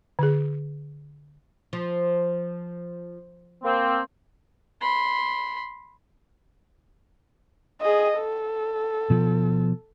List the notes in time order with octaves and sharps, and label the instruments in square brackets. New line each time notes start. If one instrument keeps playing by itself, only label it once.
[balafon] D3 G#4
[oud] F3
[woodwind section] A#3 C4
[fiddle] B5 C6
[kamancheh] G#4 D#5
A4
[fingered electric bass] B2 F3